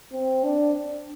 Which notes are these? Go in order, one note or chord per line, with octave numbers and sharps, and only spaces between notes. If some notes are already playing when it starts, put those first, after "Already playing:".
C4
D4